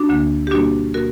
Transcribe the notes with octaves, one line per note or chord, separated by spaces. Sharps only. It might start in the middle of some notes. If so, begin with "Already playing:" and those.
Already playing: D4 F#4
D2 D3 A#3
G4
B2 G3 A#3 D4 F#4
B2 A#3 F#4 A#4